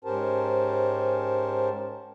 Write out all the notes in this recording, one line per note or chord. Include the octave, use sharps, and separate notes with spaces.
G#2 C#4 G4 A#4 C5 A5